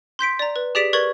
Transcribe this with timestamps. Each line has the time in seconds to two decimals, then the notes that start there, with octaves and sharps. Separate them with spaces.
0.19 C6 G6 B6 D7
0.39 D5 A#5
0.56 B4
0.75 G4 G#4 D5 B6 D7 E7
0.93 A#4 B4 D5 C#6 G#6 F#7